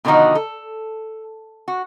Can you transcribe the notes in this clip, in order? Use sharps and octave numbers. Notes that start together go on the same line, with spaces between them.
B2 D3 D#3 F3 D#4 F#4
A4
F#4